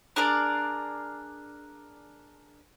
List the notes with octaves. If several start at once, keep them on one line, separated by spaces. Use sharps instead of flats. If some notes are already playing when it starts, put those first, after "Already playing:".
D4 G#4 A#4 D5